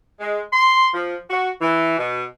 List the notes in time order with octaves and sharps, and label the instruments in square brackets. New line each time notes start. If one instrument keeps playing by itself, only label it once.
[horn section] G#3
C6
F3
F#4
E3
B2